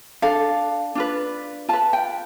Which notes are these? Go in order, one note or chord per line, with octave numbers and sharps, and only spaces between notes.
D4 A4 F5
D4 F4 B4
F4 B4 A5
G5